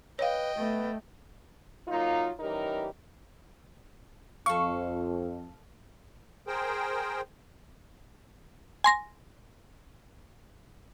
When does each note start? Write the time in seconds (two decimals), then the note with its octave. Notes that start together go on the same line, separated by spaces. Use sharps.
0.19 B4 C#5 D#5 F5 G5
0.58 A3 B3
1.88 F#3 A#3 D#4 F4
2.39 E3 G3 C#4 D#4 G4 A#4
4.46 F2 A4 F5 C#6
6.47 G#4 A#4 C5 G5
8.84 G#5 C6 A#6